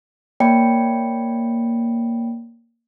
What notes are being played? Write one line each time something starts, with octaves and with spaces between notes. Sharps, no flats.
A#3 C#5 D5 G5 B5 C#7